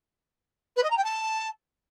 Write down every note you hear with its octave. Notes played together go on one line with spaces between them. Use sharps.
B4
D#5
A#5
G5
A5